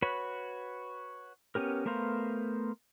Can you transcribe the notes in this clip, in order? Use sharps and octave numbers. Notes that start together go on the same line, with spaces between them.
F#4 B4 C#5 B5
B3 C#4 G4 A#4
A3 B3 A#4 C5 F5